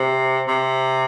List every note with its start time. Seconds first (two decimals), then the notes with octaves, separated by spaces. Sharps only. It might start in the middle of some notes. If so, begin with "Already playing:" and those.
Already playing: C3
0.48 C3